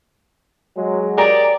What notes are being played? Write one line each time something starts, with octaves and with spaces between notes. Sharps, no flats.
F#3 G#3
G4 G#4 A#4 D5